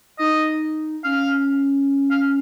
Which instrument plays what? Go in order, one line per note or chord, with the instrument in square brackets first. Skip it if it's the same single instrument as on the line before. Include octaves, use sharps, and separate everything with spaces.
[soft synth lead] D#4 [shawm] D#5
[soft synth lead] C#4 [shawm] F5
[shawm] F5